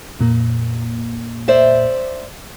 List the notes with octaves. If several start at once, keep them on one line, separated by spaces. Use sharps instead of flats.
F2 A#2 A#3
C5 D5 E5